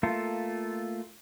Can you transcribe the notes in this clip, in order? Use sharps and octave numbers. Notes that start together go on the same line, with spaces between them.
A3 A#3 F4 A4